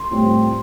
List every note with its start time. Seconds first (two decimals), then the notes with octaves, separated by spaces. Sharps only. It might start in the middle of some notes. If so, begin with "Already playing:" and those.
Already playing: C6
0.11 A2 G3 C4 F4